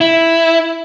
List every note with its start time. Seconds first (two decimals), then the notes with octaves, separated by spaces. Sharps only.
0.01 E4